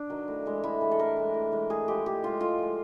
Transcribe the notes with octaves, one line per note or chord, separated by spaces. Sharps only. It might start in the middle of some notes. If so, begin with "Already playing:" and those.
Already playing: D4
D#3 F#3
A2
E3 G#3
A2 E4
E3 G#3
A4
A2 A#4
E3 G#3
A2
E3 G#3
A2 G#4
F3 G#3 G4
A2 G4
F3 G#3 F4
A2 F4
F3 G#3